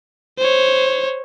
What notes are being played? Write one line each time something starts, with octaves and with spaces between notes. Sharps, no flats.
C5 C#5